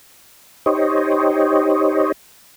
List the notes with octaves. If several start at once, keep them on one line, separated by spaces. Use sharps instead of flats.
D#4 G4 C5 C#5 D#5